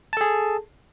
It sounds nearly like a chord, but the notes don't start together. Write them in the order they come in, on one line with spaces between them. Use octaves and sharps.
A5 A4 G#4